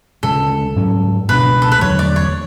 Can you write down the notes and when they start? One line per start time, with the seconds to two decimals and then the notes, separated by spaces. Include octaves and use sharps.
0.23 D2 C#3 G#3 A4
0.76 G#2 F#3 C#4
1.28 C#2 B2 G#3 D4 B4
1.62 A4
1.72 B4
1.81 E2 D3 F#3 A3 C#5
1.99 D5
2.16 C#5